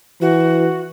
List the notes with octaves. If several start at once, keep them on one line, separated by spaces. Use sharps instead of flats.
E3 F#4